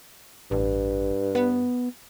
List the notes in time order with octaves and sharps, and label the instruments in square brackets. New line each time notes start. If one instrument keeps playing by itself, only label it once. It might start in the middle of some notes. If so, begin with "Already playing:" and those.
[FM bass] A1 [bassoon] G2
[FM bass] B3